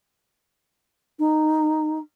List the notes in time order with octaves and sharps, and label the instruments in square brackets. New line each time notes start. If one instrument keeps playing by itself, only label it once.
[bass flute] D#4